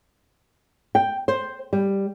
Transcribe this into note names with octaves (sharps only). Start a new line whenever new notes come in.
G5
C5
G3